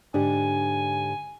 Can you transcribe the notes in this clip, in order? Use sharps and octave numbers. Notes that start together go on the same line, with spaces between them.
G#2 D3 D4 G4 G#5